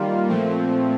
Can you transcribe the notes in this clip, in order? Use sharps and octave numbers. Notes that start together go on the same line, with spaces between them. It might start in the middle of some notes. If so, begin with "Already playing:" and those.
Already playing: D#3 G3 A#3 F4
A#2 F3 A3 C4